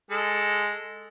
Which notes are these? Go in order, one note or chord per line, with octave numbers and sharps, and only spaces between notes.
G#3 A4